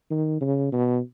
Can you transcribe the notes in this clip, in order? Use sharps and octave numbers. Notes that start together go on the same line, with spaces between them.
D#3
C#3
B2